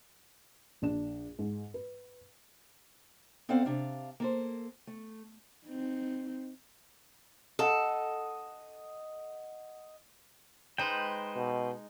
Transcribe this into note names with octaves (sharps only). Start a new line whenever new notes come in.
A#1 D4 E7
G#2
B4
B3 C4 A4 C5 D5 F5
C3 D4 F5
A#3 A4 C5
A3
C4 D#4
A4 D#5 F#5
G#3 D#4 B4 C5 G5
B2